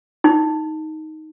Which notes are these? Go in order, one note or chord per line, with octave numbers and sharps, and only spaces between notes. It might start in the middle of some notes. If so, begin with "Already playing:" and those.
D#4